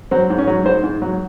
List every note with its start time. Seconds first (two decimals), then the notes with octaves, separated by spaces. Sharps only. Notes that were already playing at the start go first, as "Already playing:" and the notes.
0.11 F#3 C4
0.30 G#2
0.38 C#4
0.47 F#3
0.65 G#2 C5
0.84 G#2
1.02 F#3